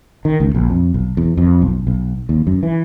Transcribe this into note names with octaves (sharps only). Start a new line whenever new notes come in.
D#3
C#2
A#1
F2
B1
E2
F2
B1
B1
D#2
F#2
E3